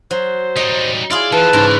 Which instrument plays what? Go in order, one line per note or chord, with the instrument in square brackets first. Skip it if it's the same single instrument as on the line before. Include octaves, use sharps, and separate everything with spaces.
[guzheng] F#3 [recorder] C5
[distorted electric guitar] G3 D#4 [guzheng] D#5
[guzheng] E4 F4 G#4 [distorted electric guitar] D5
[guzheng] E3 [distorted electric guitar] F3 [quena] B4 [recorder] A5
[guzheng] G#2 C#3 [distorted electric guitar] A#4 D5